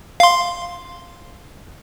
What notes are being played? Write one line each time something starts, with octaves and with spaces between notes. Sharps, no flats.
F5 C6